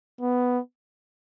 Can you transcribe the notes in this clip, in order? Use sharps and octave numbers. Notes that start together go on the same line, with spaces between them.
B3